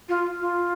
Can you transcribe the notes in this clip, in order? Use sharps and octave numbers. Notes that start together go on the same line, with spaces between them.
F4
F4